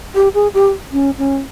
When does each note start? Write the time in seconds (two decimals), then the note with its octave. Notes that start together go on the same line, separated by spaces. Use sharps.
0.15 G4
0.34 G#4
0.54 G4
0.92 C#4
1.18 C#4